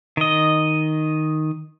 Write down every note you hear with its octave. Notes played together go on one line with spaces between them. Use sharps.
D#3 D#5